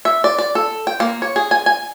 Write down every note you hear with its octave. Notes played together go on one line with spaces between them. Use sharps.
E5
D5
D5
A4
G5
A#3
C#5
G#4
G#5
G#5